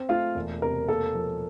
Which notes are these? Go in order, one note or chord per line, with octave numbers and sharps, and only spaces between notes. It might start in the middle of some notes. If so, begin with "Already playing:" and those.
Already playing: C4
A3 F4 F5
E1
C3 A#4
A#3 A4
F3